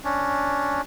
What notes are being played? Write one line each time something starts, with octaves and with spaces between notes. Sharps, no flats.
C#4 D4